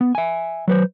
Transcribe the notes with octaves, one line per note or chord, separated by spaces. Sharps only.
B3
E5 G#5
F#3 B4 C5